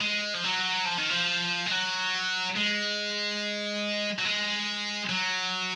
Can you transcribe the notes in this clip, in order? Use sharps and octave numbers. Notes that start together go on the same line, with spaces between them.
G#3
F3
F#3
F3
D#3
F3
G#3
F#3
G#3
F#3
G#3
F#3